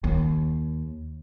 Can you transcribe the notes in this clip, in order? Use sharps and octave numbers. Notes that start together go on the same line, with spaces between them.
D#2